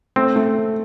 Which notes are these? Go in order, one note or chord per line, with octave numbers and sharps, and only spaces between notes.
A3 C4
A3